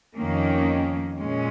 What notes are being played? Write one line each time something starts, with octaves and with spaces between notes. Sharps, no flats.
F2 D#3 A#3 C#4
A#2 G#3 C#4